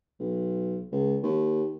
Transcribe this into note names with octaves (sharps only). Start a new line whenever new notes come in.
B1
C#2
D#2